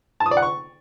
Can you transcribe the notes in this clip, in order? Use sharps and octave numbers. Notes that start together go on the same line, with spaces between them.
A5
D#6
D5
F#5
C#6